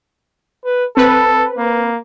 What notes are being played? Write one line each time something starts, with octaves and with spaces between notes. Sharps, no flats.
B4
C4 A4 B4
A#3